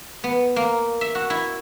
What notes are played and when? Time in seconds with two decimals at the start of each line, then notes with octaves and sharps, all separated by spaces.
0.24 B3
0.56 A#3
1.01 E5
1.15 F#4
1.30 E4